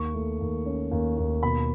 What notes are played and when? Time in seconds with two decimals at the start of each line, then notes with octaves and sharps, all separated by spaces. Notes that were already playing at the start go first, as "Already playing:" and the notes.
Already playing: D#2 C#6
0.14 A3
0.41 D#2
0.66 C#4
0.92 D#2
1.17 D#2
1.43 B2 B5